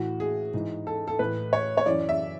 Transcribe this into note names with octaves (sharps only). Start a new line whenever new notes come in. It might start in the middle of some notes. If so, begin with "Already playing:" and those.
Already playing: A2 E3 F#4
G#4
G#2 E3
A4
A4
A2 E3 B4
C#5
C#5
F#2 E3 D5
E5